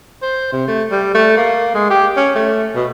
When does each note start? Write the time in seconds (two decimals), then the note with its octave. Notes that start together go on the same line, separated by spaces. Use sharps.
0.22 C5
0.53 C3
0.68 A3
0.91 G3
1.14 A3
1.37 A#3
1.75 G#3
1.90 G4
2.17 C#4
2.35 A3
2.75 B2